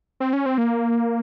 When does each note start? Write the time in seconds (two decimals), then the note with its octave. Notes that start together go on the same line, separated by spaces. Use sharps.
0.20 C4
0.33 C#4
0.46 C4
0.58 A#3